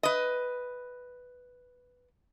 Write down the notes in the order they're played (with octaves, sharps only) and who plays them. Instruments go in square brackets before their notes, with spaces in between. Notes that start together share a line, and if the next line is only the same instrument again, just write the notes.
[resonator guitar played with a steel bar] B4 D#5